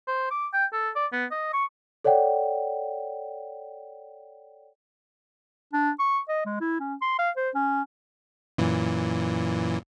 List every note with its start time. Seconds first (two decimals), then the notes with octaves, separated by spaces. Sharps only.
0.08 C5
0.31 D6
0.54 G5
0.73 A4
0.96 D5
1.13 B3
1.31 D#5
1.53 C#6
2.05 A4 C#5 D5 F#5 G5
5.73 D4
5.99 C#6
6.29 D#5
6.46 G#3
6.60 E4
6.80 C#4
7.02 C6
7.19 F5
7.37 C5
7.55 C#4
8.58 F#2 A#2 E3